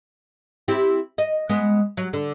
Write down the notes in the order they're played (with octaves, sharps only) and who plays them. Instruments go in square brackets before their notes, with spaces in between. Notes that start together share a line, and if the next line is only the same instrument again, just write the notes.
[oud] C4 E4 G4
D#5
G#3 B3
F#3
D3